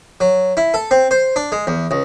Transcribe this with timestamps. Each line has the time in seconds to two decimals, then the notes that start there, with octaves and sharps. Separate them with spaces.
0.20 F#3
0.57 E4
0.74 A4
0.91 C4
1.11 C5
1.36 D4
1.52 G#3
1.67 E2
1.91 C#2